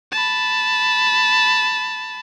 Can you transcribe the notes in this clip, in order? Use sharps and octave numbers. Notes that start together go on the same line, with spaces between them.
A5 B5